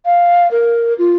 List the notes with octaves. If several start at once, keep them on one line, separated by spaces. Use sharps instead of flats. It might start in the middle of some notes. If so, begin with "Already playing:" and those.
F5
A#4
F4